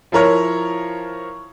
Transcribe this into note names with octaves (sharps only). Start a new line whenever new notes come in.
F3 E4 A#4 C#5 F6